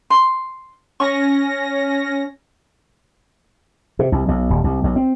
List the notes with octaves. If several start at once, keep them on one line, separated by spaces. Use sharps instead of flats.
C6
C#4 C#6 A#6
C3
C2
B1
D#1
C2
B1
C4